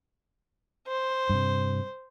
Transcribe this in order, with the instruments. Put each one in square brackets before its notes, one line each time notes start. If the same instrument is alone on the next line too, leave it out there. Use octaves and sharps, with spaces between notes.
[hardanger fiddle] C5
[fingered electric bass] G2 C3